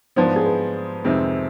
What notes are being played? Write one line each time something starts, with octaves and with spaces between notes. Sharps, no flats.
G#2 F3 B3 D4 C5
B4
G#4
B4
F2 C3 D#3 G#3 C4